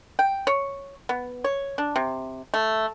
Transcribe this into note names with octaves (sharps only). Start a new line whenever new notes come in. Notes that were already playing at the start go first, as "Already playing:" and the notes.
G5
C#5
B3
C#5
D4
C3
A3